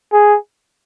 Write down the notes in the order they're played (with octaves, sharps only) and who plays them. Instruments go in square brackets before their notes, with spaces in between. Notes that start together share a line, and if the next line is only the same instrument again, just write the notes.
[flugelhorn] G#4